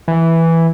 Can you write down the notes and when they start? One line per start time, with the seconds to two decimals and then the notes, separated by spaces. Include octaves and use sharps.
0.08 E3